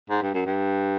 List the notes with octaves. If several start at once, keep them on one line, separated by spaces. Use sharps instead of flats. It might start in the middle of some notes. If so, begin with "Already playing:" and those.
G#2
G2
F#2
G2